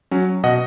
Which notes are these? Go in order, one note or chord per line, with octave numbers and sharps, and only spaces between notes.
F#3 C#4
B2 D#5 F#5